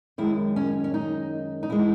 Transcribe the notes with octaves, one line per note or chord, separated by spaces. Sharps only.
F#2 D#3 G#3 E4
C#4
C#4
D#4
D#4
E3 G#3 E4